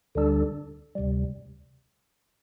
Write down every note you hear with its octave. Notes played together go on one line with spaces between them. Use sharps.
D2 D3 G3 D4 A4
D2 C3 G3